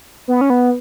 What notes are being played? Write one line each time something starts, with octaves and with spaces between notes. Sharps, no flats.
B3
C#4
B3